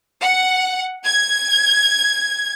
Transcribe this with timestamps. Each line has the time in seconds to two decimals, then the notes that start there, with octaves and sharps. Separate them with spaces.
0.21 F#5
1.03 G#6